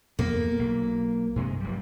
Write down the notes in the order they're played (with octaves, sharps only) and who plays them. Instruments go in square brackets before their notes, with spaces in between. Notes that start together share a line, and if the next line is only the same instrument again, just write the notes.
[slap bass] E2 B2 B3 [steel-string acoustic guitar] A#3
[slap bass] B1
G2 C3 G#3
F1 F#3 G3